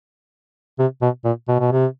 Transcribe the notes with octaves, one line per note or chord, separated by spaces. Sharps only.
C3
B2
A#2
B2
B2
C3